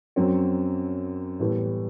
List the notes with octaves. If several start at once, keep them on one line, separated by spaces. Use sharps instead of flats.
F#2 F#3 C4
A2 E3 G3 B3